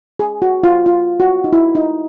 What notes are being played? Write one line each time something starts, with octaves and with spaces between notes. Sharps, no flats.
G#4
F#4
F4
F4
F#4
D#4
E4
D#4